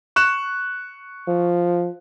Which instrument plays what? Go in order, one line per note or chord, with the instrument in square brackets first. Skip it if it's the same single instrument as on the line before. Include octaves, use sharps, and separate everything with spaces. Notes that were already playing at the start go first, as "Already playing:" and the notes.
[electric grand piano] C#6 F#6 E7
[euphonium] F3